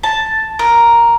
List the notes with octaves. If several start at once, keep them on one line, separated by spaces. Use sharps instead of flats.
A5
A#4